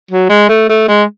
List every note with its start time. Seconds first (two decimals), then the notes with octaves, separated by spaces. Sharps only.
0.11 F#3
0.29 G#3
0.49 A3
0.69 A3
0.88 G#3